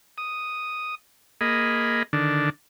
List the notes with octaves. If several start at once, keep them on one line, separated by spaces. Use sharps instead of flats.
D#6
A#3 G#4 D#5 B5
D3 D#3 D4